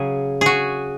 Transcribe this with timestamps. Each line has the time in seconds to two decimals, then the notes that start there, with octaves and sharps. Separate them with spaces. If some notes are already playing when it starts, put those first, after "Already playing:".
Already playing: C#3 F#3 G#4
0.41 F#4 G#4